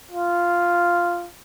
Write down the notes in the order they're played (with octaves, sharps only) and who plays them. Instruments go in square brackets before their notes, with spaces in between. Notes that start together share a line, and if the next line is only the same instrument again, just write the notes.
[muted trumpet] F4